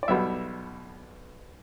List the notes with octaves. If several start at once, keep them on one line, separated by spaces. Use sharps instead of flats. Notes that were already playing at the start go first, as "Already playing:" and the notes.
D5
B1 B2 G3 E5